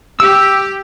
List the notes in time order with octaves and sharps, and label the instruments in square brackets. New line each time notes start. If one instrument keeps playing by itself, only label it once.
[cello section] G4 [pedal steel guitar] E6